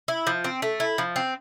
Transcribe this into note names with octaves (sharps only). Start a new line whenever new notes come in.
E4
F3
C4
A3
E4
F3
C4